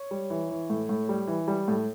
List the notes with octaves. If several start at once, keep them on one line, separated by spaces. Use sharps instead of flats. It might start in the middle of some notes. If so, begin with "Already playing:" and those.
Already playing: C#5
G3
E3
E3
A2
A2
G3
E3
G3
A2